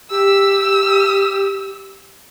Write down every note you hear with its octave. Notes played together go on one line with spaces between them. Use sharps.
G4 E6